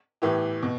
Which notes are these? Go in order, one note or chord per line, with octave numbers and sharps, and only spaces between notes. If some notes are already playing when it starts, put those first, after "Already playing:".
A2 E3 B3 E4 G4
B2